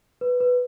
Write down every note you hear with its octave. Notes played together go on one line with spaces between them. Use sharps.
B4
B4